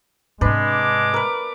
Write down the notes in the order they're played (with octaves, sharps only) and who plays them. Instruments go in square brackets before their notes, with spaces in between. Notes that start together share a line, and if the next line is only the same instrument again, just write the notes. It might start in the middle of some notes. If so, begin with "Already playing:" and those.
[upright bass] G#2 C3 [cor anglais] G#3 [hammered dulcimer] D4 B4
[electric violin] D6
[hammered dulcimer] A#4 B4